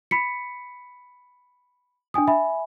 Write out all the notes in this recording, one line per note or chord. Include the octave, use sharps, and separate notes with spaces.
B5 B6 C#7
D4 G5 G#5 D#6
E5 G#5 B5